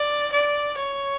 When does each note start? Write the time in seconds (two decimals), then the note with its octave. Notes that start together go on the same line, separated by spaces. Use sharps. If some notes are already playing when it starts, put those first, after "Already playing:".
Already playing: D5
0.32 D5
0.78 C#5